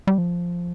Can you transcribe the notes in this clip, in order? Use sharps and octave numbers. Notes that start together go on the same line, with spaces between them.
G3
F3